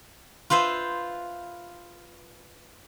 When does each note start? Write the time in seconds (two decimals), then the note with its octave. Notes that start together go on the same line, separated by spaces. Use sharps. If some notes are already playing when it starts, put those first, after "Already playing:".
0.50 F4 B4 C5 E5